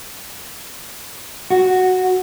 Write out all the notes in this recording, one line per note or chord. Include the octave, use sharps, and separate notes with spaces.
F#4